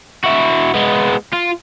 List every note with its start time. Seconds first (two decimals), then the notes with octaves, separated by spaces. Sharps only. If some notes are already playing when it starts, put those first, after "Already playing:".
0.24 E4 F#4
0.74 G#3 B3
1.33 F4